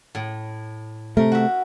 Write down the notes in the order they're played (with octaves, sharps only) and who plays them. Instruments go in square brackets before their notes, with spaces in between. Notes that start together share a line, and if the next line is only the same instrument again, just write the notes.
[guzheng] A2
[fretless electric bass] C3 A3 [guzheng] A#4
[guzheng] F#4 E5